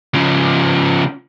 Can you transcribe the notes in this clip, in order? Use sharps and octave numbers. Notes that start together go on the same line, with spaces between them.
C#3 F3